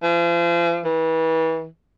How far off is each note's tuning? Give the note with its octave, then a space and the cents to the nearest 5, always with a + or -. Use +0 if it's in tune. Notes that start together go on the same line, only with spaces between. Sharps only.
F3 -40
E3 -30